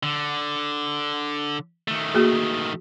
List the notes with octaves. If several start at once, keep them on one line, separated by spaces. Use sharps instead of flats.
D3
D#3 A3
A#3 F#4 G#4